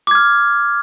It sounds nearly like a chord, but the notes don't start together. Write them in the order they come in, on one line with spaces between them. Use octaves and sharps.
D6 G#6 F6